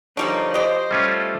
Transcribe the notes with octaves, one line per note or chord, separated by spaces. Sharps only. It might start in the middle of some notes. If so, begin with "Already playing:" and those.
D3 F3 G3 A#3 D#4 C#5
G4 C5 D#5
G3 A3 C#4 F4